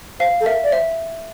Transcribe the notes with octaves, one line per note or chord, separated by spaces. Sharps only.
C5 F5
A4
A#4 E5
D5
C5 E5